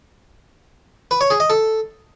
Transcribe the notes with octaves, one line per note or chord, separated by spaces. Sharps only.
B4
C#5
G#4
D#5
A4